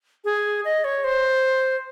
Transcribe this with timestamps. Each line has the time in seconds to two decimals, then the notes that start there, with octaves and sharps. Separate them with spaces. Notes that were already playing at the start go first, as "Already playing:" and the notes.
0.25 G#4
0.65 D#5
0.84 C#5
1.04 C5